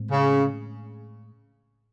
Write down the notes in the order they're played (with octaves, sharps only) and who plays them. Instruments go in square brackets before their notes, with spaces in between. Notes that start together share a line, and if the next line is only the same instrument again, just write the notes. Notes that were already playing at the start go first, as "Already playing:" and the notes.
Already playing: [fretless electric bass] A2 G#3 C4
[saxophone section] C#3